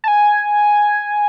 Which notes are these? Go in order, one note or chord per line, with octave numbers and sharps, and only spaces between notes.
A5
G#5